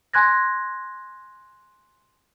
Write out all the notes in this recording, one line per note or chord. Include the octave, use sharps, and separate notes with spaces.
G#5 C6 F#6 G#6 A#6